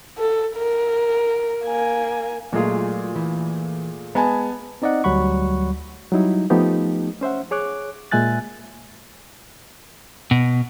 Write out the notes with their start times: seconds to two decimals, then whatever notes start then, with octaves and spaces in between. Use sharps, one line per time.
0.18 A4
0.56 A#4
1.64 A#3 G#5
2.53 A#2 F#3 G#3 A3 F4 G#4
3.16 E3
4.15 G#3 B3 G#5 A5
4.82 C4 D#4 D5 D#5 F#5
5.04 D2 F#3 G3 F#5 B5 C#6
6.12 F#3 G3 D#4 E4
6.50 F3 A3 B3 D#4 G4
7.21 C#4 C5 E5 F#5
7.51 G#4 C#5 D6 F#6
8.11 A#2 G#3 E5 G#5 F#6 A6
10.31 B2